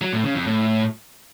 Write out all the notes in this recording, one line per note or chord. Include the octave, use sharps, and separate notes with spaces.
F#3
A2
C#3
F2
A2